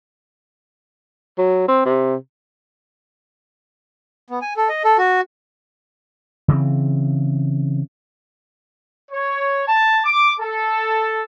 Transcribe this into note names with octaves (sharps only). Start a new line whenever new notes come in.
F#3
C4
C3
B3
G#5
A4
D#5
A4
F#4
C#3 E3 C4
C#5
A5
D6
A4